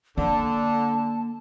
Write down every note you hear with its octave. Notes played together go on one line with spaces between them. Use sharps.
D3 A#3 A5